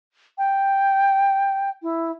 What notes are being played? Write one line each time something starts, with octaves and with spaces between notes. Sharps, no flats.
G5
E4